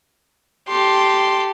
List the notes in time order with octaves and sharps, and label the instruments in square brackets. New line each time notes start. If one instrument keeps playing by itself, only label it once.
[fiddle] G4 A4 [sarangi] C6